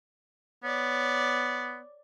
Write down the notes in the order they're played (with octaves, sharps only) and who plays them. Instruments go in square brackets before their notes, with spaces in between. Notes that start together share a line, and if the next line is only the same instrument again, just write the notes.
[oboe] B3 [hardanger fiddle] C#5 D5